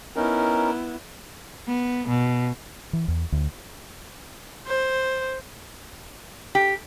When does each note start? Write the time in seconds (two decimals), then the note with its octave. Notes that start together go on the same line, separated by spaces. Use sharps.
0.16 B3 C#4 D#4 E4 A#4
1.67 B3
2.08 B2
2.93 E3
3.08 E2
3.32 D2
4.66 C5
6.55 G4